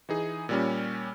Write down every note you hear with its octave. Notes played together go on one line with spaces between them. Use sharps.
E3 D#4 G#4
A#2 G3 C#4